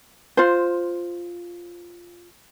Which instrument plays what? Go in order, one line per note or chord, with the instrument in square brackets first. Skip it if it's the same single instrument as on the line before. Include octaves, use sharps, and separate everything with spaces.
[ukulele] F4 C5